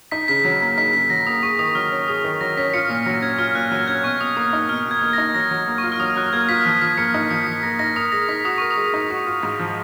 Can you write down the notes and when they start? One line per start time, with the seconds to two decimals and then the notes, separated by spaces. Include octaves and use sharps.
0.12 D#4 B6
0.28 C#3 B6
0.44 F#3 B6
0.61 A#3 B6
0.78 D#4 B6
0.93 C#3 B6
1.10 F#3 A#6
1.26 A#3 D#6
1.43 G#4 C#6
1.59 D#3 D#6
1.75 F#3 F6
1.92 C#4
2.08 G#4 D#6
2.24 D#3
2.41 F#3 A#6
2.57 C#4 B6
2.74 F4 C#7
2.89 A#2 B6
3.06 F#3 A#6
3.22 C#4 G#6
3.38 F4 F6
3.55 A#2 F#6
3.71 F#3 A#6
3.88 C#4 G#6
4.04 B2 C#6
4.20 B2 D#6
4.36 A#3 D#6
4.53 D#4 F6
4.69 B2 F6
4.85 B2
4.91 G#6
5.02 A#3
5.13 A#6
5.18 D#4
5.35 F#3 A#6
5.51 F#3
5.67 A#3
5.78 C#6
5.84 F4
5.92 F6
6.00 F#3 D#6
6.16 F#3 F#6
6.33 A#3 G#6
6.49 F4 B6
6.65 F3 B6
6.82 F3 B6
6.97 A#3 C#7
7.14 D#4 C#7
7.31 F3 C#7
7.47 F3 B6
7.63 A#3 A#6
7.79 D#4 A#6
7.96 A#4 D#6
8.12 G#3 A#6
8.28 D#4 B6
8.45 F#4 D#6
8.58 A#4 C#6
8.71 D#6
8.77 G#3
8.94 D#4
9.10 F#4
9.27 F4
9.43 G#2
9.59 F3